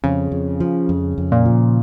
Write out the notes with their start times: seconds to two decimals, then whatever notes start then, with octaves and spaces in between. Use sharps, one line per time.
0.04 F2 C#3
0.32 F2
0.60 F3
0.89 F2
1.18 F2
1.32 A#2
1.45 F3